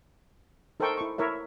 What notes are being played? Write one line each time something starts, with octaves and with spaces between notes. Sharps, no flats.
D#4 A4 A#4 C5 G5 C#6
E4 C#6
E4 A#4 C#5 E5